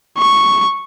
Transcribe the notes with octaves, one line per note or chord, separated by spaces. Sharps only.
C#6